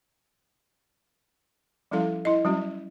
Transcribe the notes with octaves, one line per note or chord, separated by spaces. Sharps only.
F3 G3 C#4 E4 A4 F5
E4 D#5
F#3 G3 C#4 F#4